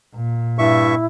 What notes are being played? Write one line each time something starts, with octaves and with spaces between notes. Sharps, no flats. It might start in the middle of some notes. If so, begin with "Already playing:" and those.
A#2
G2 E4 E5 C#6